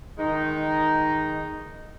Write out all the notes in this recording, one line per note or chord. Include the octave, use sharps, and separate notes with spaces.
D#3 G#3 D#4